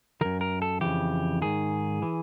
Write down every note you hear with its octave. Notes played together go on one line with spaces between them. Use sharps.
F#2 D#3 A#4
A#4
A4
F2 C#3 E3 G4
G#2 D#3 G#4
E3